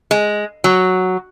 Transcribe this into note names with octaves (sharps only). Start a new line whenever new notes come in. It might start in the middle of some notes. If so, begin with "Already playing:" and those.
G#3
F#3